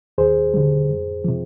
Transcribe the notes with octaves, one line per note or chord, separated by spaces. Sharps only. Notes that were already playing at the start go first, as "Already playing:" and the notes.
D#2 G#4 C5
D3 G3
F2
C3 F3